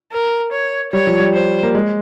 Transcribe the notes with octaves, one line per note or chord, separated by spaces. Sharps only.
A#4
C#5
G3 C#5
F3
G3
C5
A#3
G#3